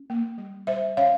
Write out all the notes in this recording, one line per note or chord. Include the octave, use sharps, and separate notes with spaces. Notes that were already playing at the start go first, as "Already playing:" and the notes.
Already playing: C#4
A#3
G3
G3 C5 E5
C#4 C#5 F5